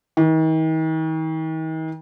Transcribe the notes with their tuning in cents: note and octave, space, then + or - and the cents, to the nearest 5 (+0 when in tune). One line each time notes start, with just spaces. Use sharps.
D#3 +45